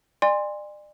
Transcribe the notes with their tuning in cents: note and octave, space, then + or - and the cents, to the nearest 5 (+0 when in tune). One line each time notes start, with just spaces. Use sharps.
D5 +35 G#5 -30 C6 +0